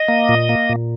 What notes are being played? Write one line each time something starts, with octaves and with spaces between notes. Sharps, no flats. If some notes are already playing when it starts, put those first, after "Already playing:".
Already playing: D#5
A#3
A#2
A#3
A#2